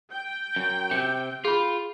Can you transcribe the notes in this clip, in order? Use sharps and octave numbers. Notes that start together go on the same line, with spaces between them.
G5
F#2
C3 G6 C#7
F4 G#4 B5